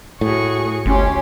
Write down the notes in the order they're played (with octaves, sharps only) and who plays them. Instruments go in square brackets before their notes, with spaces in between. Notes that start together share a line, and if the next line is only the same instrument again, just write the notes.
[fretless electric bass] A2 [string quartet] F#4 G#4 C#6
[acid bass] G1 [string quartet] D2 G4 C6 [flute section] C#4